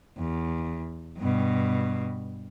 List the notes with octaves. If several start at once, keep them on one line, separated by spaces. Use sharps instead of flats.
E2
G2 B2